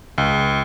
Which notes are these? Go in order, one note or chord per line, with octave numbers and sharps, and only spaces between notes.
C#2